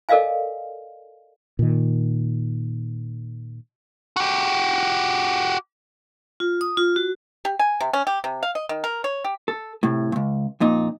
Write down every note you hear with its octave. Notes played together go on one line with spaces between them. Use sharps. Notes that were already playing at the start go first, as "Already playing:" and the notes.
A4 A#4 D5 D#5 F5 G#5
A#2 D#3
F#4 G4
F4
D#6
F4
F#4
G4
G#5
C3
C#4
G4
C3
F5
D#5
D#3
A#4
C#5
G4
A4
A2 C3
C#2 G2
F2 A#2 D#4